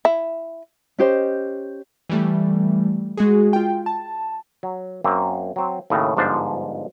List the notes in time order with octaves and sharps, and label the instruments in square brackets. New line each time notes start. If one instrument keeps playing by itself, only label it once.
[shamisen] E4
[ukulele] C#4 G4 C5 D#5
[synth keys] E3 G3 A3
G#3 F#4 G#4
F4 G5
A5
[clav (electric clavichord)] F#3
F#2 A#3 C4
F#3 C4
D#2 A2 C#3
G1 G#2 F3 D4 C5